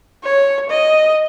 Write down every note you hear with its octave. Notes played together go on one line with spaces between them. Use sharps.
C#5
D#5